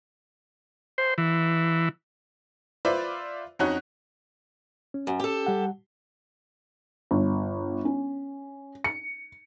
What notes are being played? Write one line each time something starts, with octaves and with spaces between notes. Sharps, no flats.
C5
E3
F4 B4 C5 D5 E5
F2 C#4 D#4 F#4 C#5 F#6
C#4
F#2
G4 A4
G3 F#5
G1
C#4
C#7